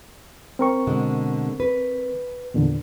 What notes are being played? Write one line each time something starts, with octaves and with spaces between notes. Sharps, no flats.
C4 A#4 C#6
B2 D3 G#3
B4
E2 A#2 D3